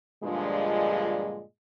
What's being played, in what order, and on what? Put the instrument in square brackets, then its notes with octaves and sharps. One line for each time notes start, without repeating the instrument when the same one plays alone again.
[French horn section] G2 A#2 D3 F3 G#3